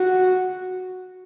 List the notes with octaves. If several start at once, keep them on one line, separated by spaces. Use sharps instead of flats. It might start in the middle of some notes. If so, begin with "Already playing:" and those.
Already playing: F#4